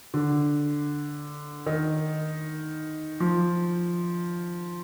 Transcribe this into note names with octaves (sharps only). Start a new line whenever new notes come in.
D3
D#3
F3